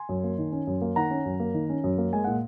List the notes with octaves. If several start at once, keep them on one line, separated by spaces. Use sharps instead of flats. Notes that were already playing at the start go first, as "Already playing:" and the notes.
Already playing: G#5 C6
F#2
A#3
D#3
C#4
F#2
A#3
D#3 F#5 A#5
C#4
F#2
A#3
D#3
C#4
F#2
A#3
G#3 G#5
A#2 F#5